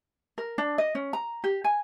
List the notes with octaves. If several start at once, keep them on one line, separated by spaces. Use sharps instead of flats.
A#4
D4
D#5
C#4
A#5
G4
G#5